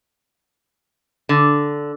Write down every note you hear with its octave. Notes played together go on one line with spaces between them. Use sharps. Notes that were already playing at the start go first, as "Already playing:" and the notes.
D3